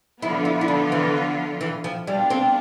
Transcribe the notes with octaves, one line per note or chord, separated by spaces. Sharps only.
D3 F3 B3 E4 F4
E4
E4
D4
E3
E3
F3
B2 G3 B3 D4 F4
C4